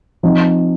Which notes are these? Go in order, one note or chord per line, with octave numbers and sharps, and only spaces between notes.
F3 C4 D#4